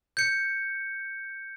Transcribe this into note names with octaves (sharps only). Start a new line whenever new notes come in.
G6 C#7